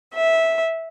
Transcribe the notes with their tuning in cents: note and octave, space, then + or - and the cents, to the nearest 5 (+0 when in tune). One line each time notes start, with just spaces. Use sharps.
E5 -10